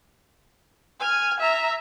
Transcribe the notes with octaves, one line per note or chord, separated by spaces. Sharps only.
G#5 F6
E5 A#5